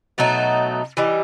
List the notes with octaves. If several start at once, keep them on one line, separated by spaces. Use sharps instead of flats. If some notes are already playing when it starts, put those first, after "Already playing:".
B2 F#3 A3 D#4
E3 G3 D#4